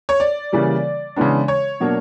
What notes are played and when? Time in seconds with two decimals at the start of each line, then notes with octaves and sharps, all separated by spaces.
0.09 C#5
0.20 D5
0.52 C#3 E3 G3 A#3
1.16 C#3 E3 G#3 B3 D4
1.48 C#5
1.80 B2 F#3 A#3 D4